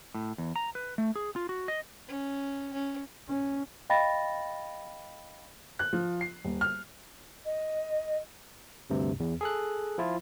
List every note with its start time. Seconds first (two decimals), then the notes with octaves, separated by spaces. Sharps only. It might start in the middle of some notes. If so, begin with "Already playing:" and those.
0.15 A2
0.38 E2
0.56 A#5
0.75 B4
0.98 A3
1.16 G#4
1.36 F4
1.49 F#4
1.68 D#5
2.09 C#4
2.74 C#4
3.28 C#4
3.90 D#5 F5 G5 B5 A6 A#6
5.79 F#6
5.93 F3
6.21 C7
6.45 D#1
6.61 F6
7.45 D#5
8.90 D2 G2 C3
9.20 E2
9.41 G#4 A4 F#6
9.98 F3 E4 F4